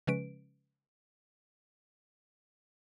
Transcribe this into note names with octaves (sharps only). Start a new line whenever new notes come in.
C#3 F3 G#3 C#4 B4 D7